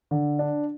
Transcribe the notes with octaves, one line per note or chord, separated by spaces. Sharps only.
D3
D4